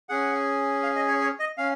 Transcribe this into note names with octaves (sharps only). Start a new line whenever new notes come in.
C#4 G#4 F#5
F5
D#5
C#5
C#5
D#5
C#4 F5